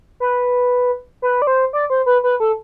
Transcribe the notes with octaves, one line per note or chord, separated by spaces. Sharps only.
B4
B4
D5
C5
D5
C5
B4
B4
A4